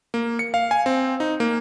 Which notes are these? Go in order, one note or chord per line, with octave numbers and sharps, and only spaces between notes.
A#3
C#7
F5
G#5
C4
D#4
A#3